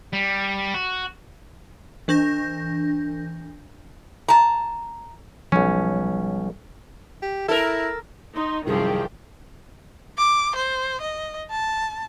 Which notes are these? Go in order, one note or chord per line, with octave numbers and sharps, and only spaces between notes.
G3
F#4
E3 D4 G6 A#6
A5 A#5
B1 F3 G3 C#4
G4
E4 A4 A#4
D#4 C6
C2 F#2 C3 D#3 F3 G4 G#4
D6
C5
D#5
A5